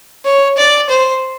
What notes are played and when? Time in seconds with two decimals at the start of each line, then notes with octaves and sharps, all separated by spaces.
0.25 C#5
0.57 D5
0.89 C5